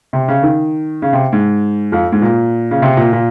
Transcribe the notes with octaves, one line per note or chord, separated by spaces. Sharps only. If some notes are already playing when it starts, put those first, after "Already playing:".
C3
C#3
D#3
C#3
C3
G#2
F2
G#2
A#2
C#3
C3
A#2
A#2